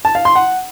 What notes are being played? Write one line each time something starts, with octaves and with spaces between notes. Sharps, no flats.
A5
F5
C6
F#5